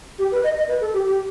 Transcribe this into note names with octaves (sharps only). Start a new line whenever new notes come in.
G4
B4
D#5
D#5
B4
A4
G4
G4